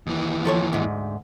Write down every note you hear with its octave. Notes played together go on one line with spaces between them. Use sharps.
D#2 E3
F3 A4 C#5
D2 G#2